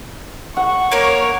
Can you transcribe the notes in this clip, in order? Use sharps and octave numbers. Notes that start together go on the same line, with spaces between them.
F#5 C#6
A#3 A#4 C#5